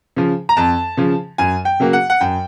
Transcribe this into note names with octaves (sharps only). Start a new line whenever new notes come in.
C#3 F3
A#5
F2 A5
C#3 F3
F#2 G#5
G5
C#3 F#3 A#3
F#5
F#5
F#2 G5